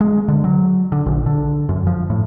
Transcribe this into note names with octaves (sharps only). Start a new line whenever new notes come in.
G#3
D3
F#3
D3
A#1
D3
F#2
F3
A2